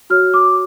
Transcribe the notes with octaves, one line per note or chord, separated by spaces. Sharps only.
F#4 C#5 F6
D6